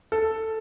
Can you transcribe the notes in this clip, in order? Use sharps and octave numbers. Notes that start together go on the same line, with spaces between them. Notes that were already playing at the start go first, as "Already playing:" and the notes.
A4